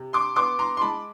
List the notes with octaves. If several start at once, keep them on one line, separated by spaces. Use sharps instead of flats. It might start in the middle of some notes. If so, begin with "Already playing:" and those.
Already playing: C3
C6 D6
B3 C6 D6
A#5 C6
C6
G#3 A5 B5